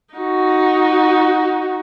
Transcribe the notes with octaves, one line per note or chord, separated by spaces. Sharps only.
D#4 F#4